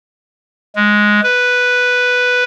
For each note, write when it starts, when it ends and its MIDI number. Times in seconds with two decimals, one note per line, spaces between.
0.76 1.21 56
1.23 2.44 71